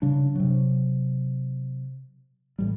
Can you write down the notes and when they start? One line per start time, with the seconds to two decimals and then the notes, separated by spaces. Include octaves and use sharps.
0.02 C#3 G3 D4
0.35 C3 F#3
2.59 A1 G3